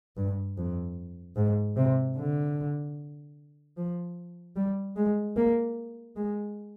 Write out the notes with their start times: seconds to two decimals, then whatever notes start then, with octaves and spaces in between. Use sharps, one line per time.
0.17 G2
0.57 F2
1.36 G#2
1.76 C3
2.17 D3
3.77 F3
4.56 G3
4.96 G#3
5.37 A#3
6.16 G#3